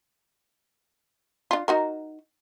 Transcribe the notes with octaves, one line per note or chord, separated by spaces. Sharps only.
D4 F4
D#4 F#4 A#4